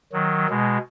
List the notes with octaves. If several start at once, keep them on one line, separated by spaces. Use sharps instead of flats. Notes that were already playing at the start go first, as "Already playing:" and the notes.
D#3 F#3
B2 G#3